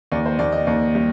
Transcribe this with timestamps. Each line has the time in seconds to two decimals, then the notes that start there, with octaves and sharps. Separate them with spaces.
0.12 D#2 D5
0.26 C5
0.39 D#2 D5
0.52 D#5
0.67 D#2
0.95 G3